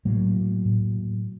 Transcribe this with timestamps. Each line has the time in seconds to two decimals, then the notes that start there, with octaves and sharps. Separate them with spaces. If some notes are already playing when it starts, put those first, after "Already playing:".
0.05 A2 F#3 A#3
0.65 A2